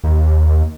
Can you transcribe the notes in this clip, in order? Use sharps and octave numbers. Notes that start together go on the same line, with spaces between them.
D#2